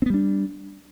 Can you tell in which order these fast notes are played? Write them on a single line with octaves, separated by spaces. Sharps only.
C4 B3 G3 D4